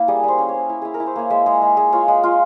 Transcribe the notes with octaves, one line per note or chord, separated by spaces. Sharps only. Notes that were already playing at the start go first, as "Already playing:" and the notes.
Already playing: A#3 E4
G3 G#4
G3 C5
C#4
C#5
C#4
E4
E4 G#4
A#4
E4
C5
A#3 C#5
G#3 E5
G#3
G#3
G#3
F4 C#5
G#3
F4